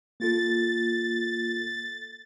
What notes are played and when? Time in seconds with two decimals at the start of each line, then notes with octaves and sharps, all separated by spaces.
0.20 A#3 F4 A4 A6